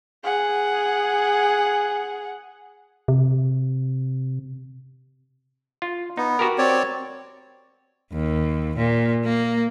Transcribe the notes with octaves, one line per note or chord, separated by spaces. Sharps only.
G#4 F#5
C3
F4
B3 D#4
F#4 G4 A#4
C4 C#5 D5
D#2
A#2
A#3